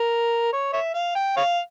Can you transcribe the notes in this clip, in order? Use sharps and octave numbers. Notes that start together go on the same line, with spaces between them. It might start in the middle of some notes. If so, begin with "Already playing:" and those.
Already playing: A#4
C#5
C#5 E5
F5
G5
C#5 F5